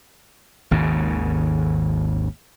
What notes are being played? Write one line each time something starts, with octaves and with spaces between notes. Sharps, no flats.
G#1 D#2 G#2 C#3